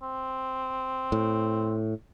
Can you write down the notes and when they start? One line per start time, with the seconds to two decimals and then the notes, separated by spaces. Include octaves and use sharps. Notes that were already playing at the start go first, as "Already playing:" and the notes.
0.02 C4
1.12 A2